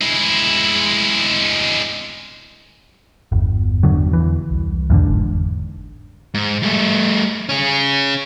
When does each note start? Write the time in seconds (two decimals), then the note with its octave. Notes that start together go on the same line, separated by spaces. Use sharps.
0.01 G#3 E4
3.32 G1 E2
3.83 D3 F#3
4.13 E3
4.51 C2
4.90 E2 G#2 D3
5.09 G1
6.34 G#2
6.63 G3 A3
7.49 C#4 G#4